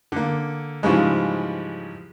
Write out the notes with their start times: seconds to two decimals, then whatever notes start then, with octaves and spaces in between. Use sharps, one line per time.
0.12 D3 A#3
0.83 G#2 C#3 E3 F3 G3 G#3